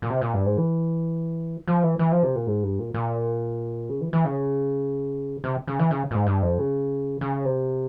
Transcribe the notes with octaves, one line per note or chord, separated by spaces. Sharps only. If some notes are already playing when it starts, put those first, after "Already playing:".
A#2
C3
A#2
G2
G#2
E3
F3
E3
E3
F3
C3
A#2
G#2
G2
A#2
A#2
C#3
E3
E3
C#3
C3
C#3
E3
C#3
A#2
G#2
G2
F2
C#3
C#3
C3